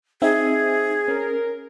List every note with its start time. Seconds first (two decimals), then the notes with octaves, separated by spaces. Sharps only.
0.22 C4 D#4 G#4 E5
1.08 C#4 A#4